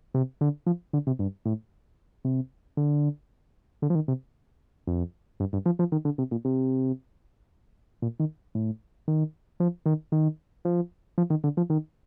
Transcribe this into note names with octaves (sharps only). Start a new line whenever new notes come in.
C3
D3
F3
D3
C3
G2
A2
C3
D3
D3
F3
D#3
C3
F2
G2
G2
F3
F3
D#3
D3
C3
A#2
C3
A#2
D#3
A2
D#3
F3
D#3
D#3
F3
F3
D#3
D3
F3
D#3